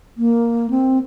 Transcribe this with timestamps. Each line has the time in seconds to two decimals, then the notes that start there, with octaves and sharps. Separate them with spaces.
0.18 A#3
0.70 C4